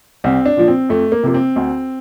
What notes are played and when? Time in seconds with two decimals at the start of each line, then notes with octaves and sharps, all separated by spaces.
0.24 C2 C4
0.46 D4
0.57 A#2 F3
0.68 C4
0.89 F2 A3
1.12 A#3
1.23 C3 F3 A#3
1.34 C4
1.56 D2